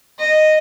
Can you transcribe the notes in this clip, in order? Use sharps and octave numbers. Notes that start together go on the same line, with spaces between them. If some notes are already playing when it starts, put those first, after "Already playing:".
D#5